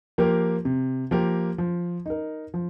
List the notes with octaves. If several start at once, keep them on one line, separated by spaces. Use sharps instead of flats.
F3 A#3 G4 A#4
C3
F3 A#3 G4 A#4
F3
D#4 A#4
F3